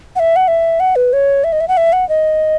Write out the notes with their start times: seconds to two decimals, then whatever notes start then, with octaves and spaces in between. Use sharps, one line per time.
0.16 F#5
0.19 E5
0.36 F#5
0.48 E5
0.80 F#5
0.96 B4
1.13 C#5
1.44 E5
1.52 D#5
1.60 E5
1.68 F#5
1.77 E5
1.93 F#5
2.09 D#5